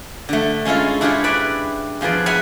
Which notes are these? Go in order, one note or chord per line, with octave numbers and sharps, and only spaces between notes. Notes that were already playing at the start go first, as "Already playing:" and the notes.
D3 A3
G#3 C#4 E4 F4 A4
D4 E4 F4 G4 G#4 C#5
B4 D5 E5 B5
E2 F3 G#4 B4 D5
B4 C#5 E5 F#5 G#5 B5